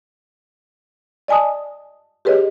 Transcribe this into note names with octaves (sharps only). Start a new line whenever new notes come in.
D5 D#5 G#5 A5 D#6
G4 G#4 B4 C#5 D#5